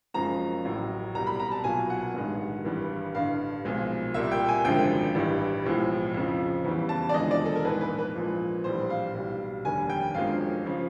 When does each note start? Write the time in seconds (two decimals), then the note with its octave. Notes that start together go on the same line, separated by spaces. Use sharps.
0.14 F#1 F#2 C#3 F3 G#3 A#5
0.65 A1 A2 F#3
1.14 C2 B2 G3 A#5
1.27 B5
1.40 A#5
1.52 A5
1.64 B1 A#2 F#3 G#5
1.90 F#5
2.14 A1 G2 D#3 G#3
2.65 G#1 G2 E3 G3
3.15 A1 G2 D3 F5
3.65 B1 A#2 F3 G#3
4.14 C2 A#2 G3 E5
4.32 G5
4.48 G#5
4.65 G#1 F#2 D3 F3 G#3 G5
5.15 A1 G2 E3 G3
5.65 B1 A2 F3 G#3
6.14 F2 C#3 F3
6.64 E2 C#3 E3 G3
6.89 A5
7.09 D5
7.14 E1 D#2 D3 F3 G#3 D#5
7.31 D5
7.46 A4
7.56 A#4
7.64 A#1 G#2 E3 G#3 B4
7.81 B4
7.99 B4
8.15 A#1 A#2 F3 G#3
8.64 A#1 A2 E3 G3 C5
8.90 F5
9.15 B1 B2 G3
9.65 F1 D#2 D3 G3 G#5
9.90 G5
10.14 G1 F#2 D3 F3 G#3 F5
10.65 C#3 F3